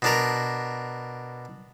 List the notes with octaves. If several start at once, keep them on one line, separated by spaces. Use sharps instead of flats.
B2 D4 A#4